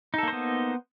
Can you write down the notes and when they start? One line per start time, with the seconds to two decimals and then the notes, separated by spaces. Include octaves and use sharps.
0.14 D#4
0.18 A4
0.23 A#3
0.28 C5
0.32 B3